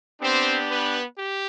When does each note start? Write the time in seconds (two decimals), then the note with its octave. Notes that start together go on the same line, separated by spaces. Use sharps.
0.21 B3 C4 D4 G4 C5
0.70 B3 B4
1.19 G4